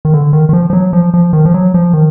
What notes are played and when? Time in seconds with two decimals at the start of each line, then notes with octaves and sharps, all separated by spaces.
0.05 D#3
0.14 D3
0.33 D#3
0.49 D#3
0.53 F3
0.70 F3
0.73 F#3
0.93 F3
1.14 F3
1.33 D#3
1.45 F3
1.54 F#3
1.74 F3
1.93 D#3